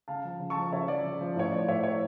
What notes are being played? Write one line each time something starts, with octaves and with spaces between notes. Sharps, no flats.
C#3 F5 A5
F3
C#3
A5 C#6
F3
C#3 C#5 E5
F3 D5
C#3
F3
A2 C#5
F3 D5
A2 C#5 E5
F3 C#5 E5